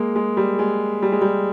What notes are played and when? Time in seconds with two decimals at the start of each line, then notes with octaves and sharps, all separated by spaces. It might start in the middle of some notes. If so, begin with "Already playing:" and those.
Already playing: G#3 A#3
0.16 G#3
0.37 G3
0.59 G#3
1.02 G3
1.12 G#3
1.22 G3